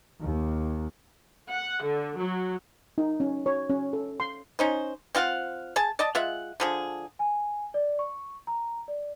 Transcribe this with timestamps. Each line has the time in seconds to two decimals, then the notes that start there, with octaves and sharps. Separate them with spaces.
0.21 D#2
1.49 F#5
1.83 D3
2.19 F#3
2.98 D#4
3.20 C#4
3.46 C#5
3.69 C#4
3.93 A4
4.20 C6
4.59 C#4 D#4 C5
5.15 C4 F4 F5 F#5
5.76 G#4 G#5 A5
5.99 D5 D#5 A5
6.15 G#3 F4 E5 F#5
6.60 D3 F3 G#4
7.19 G#5
7.74 D5
7.99 C#6
8.47 A#5
8.88 D5